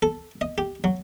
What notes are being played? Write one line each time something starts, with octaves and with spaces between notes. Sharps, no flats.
A4
D#5
G4
F#3